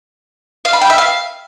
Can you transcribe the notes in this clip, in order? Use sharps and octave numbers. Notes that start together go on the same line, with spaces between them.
F5
B5
G5
E5
F5